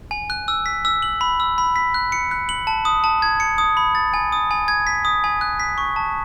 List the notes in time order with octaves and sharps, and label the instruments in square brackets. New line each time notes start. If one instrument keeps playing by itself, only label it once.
[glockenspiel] G#5
F#6
E6
B6
E6
F#7
B5
E6
B5
B6
F#6
C#7
F#6
F#7
A5
D#6
A5
G#6
C#7
D#6
B5
A6
G#5
D#6
G#5
G#6
B6
D#6
G#5
F#6
B6
C#6
A5